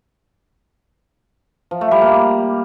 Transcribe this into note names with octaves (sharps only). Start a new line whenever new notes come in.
F3
A3
G3
A#3